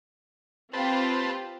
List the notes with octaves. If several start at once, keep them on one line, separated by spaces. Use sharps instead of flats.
C4 F4 G4 B4 C5 A5